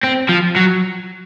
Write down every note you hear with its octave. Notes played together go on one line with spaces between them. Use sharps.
C4
F3
F#3